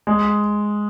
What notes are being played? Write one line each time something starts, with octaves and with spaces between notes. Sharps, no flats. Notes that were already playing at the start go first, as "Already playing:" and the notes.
G#3